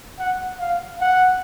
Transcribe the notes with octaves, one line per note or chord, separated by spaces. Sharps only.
F#5
F5
F#5